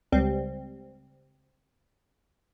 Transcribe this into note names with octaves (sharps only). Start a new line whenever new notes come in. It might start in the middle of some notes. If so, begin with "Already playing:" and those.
C#2 G3 C4